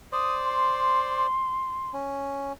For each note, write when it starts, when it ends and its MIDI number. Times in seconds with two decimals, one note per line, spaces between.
0.12 1.27 72
0.12 1.27 74
0.12 0.34 87
0.44 1.90 84
1.94 2.53 61